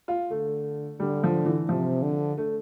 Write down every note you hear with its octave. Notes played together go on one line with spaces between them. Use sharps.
F4
D3 A3
D3 G3
F3
E3
C3 F3
D3
A3